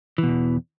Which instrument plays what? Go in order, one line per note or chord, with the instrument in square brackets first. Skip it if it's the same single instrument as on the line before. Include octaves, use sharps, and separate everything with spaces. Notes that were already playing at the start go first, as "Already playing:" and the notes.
[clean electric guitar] E3
B2
E2